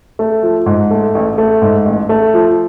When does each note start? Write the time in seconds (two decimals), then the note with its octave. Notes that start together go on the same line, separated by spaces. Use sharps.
0.19 A3
0.43 F3
0.66 G#2
0.91 A3
1.15 A1
1.38 A3
1.62 G#2
1.86 A1
2.09 A3
2.34 F3